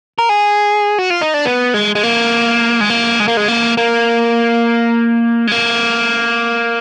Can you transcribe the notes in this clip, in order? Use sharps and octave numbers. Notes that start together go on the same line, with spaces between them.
A#4
G#4
F#4
F4
D#4
D4
B3
G#3
G#3
A#3
G#3
A#3
G#3
A#3
G#3
A#3
A#3
G#3
A#3